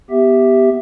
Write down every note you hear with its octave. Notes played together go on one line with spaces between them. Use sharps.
B3 G4 E5